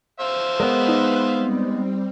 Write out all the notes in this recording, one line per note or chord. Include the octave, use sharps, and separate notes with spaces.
C5 E5 F5
G#3 B3 A#4 B4 F#6
D#4
G3 C4